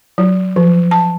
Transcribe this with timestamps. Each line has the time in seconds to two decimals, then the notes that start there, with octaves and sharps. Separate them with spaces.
0.18 F#3
0.56 F3
0.91 A5